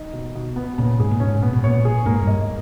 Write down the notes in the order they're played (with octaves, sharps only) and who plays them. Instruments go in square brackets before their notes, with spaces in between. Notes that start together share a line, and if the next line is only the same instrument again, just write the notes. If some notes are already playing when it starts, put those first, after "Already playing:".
Already playing: [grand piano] D#4
B2
B2
B3
[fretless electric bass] A#2 [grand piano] C#3
[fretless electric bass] G#2 [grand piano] G#4
[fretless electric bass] A#2
[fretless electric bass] G#2 [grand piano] C#4
[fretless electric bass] A#2 [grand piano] B3
[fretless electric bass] B2
[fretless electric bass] A#2 [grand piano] C#5
[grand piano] G#4
[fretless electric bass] G#2 [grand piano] A#3
[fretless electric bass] G2
[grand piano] D#5